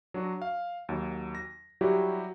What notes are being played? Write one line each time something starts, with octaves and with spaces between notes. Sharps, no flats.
F#3 D4 F#4
F5
D#2 F#3
A#6
F#3 G3 E4 F#4 G4